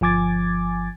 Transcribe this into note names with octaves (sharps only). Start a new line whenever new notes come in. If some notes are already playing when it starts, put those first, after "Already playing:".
G1 F3 G#5 D6 G#6 A6